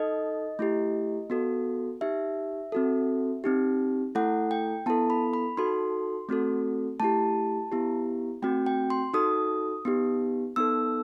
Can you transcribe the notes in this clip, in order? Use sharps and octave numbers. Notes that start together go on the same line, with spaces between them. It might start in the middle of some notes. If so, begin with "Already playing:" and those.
Already playing: D#4 A4 D#5
A3 E4 G4
B3 F#4 A4
D#4 G4 E5
C4 F#4 A4
C4 D#4 G4
A3 E4 A4 F#5
G5
B3 E4 A4 A5
B5
B5
D#4 F#4 A4 C6
A3 C4 F#4 A4
A3 E4 G4 A5
B3 E4 G4
A3 C4 F#4 G5
G5
C6
D#4 F#4 A4 D#6
B3 D#4 G4
B3 D#4 A4 E6